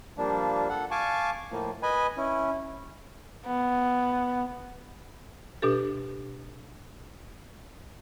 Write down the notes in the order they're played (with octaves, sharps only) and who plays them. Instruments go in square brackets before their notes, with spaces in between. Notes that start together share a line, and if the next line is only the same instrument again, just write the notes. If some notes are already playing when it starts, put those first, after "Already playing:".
[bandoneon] F3 G3 A#3 D4
A4 F#5
F5 G#5 A5 C#6 D6
A2 F3 A#3
B4 D#5 G#5 B5
C#4 E4
[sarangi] B3
[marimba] B2 D4 G4 A4